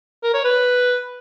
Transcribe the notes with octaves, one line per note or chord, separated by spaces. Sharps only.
A#4
C#5
B4